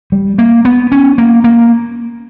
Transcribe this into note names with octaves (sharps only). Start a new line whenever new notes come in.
G3
A#3
B3
C#4
A#3
A#3